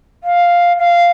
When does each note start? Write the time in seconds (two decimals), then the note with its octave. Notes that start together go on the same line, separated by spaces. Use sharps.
0.24 F5
0.79 F5